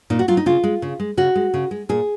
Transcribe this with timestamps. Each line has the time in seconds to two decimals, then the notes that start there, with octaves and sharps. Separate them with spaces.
0.10 A#2 D#4
0.19 F#4
0.28 F#3 F4
0.37 D#4
0.46 C#3 F4
0.64 G#3
0.82 C#3
1.00 G#3
1.17 C#3 F#4
1.35 G#3
1.54 C#3
1.71 G#3
1.89 A#2 G#4